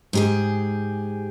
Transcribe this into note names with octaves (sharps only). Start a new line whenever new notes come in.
G#2 G4 G#4